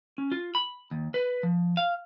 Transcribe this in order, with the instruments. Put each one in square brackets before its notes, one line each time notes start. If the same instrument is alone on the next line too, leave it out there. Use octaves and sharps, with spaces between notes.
[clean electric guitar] C#4
F4
B5
D#2
B4
F3
F5